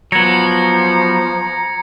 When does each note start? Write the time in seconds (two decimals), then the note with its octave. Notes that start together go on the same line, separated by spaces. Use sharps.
0.12 F3 F#3 B3 A#5 G#6 A#6 C#7